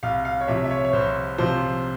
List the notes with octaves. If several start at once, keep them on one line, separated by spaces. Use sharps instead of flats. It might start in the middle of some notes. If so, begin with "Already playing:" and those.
C2 F5
F5
C#5
C3 F3 E5
E5
C#5
C#5
C2 C5
C3 F3 C5